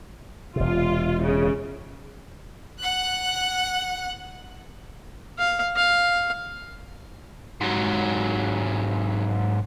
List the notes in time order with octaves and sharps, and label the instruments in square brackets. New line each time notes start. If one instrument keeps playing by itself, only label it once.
[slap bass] E1 C3 [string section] F4
[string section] C#3
[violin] F#5 F#6
[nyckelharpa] F5
F5
[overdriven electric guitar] G#2 F#3